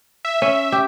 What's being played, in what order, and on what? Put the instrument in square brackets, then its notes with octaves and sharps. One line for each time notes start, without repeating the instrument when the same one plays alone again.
[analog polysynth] E5
[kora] C#4
G4